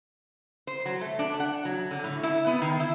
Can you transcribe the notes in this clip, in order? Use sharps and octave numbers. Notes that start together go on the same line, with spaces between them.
C5
F#3
A3
D4
F#5
F#3
D3
A2
E4
B3
D#3
E4